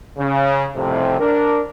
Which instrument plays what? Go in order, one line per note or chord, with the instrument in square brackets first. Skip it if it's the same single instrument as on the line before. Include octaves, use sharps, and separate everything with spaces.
[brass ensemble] C#3
C2 F2 A2 C3
D4 A#4